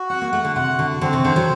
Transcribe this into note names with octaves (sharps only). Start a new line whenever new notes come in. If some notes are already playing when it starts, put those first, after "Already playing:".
Already playing: F#4
C4 F#5
A#3
A3 F#5
D3
C3 F#5
D3 F#4
D3 C4
C3
D3 C5
F#3